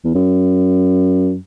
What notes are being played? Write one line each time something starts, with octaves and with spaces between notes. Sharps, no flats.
E2
F#2